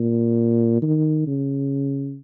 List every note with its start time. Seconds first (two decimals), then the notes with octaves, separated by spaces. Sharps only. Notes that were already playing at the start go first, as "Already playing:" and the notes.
Already playing: A#2
0.82 D#3
1.27 C#3